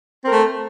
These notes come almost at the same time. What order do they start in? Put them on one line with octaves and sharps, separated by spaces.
C4 A#4 A3